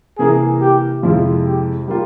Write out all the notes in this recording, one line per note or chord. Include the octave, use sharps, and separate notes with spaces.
C3 E3 A#3 E4 G#4 A#4
G4
F2 C3 F3 G#3 E4 F4
G4
G3 A#3 F4